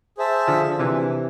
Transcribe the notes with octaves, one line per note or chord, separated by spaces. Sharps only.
G#4 C5 E5 A5
D3 F3
C3 E3